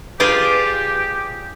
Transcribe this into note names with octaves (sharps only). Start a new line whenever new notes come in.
F4 G4 G#4 B4 D5